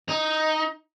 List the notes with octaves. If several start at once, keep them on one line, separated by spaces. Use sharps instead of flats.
D#4